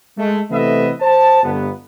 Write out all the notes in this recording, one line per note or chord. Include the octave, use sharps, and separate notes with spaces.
G#3 A3
C3 E3 A3 B3 D#5 E5
C5 A5
G1 B3